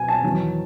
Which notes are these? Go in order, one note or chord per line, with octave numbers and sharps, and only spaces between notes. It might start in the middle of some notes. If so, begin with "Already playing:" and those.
Already playing: B2 F#3 G#5
A5
E2 D#3 F#3